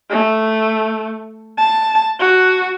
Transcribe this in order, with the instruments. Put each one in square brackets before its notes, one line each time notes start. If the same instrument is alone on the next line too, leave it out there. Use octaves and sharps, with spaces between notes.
[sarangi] A3
A5
F#4